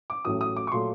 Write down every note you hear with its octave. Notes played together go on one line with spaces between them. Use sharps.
D6
A1 A2 F#3 A3 D#6
D#6
D6
C#6
A#2 F#3 A3 C6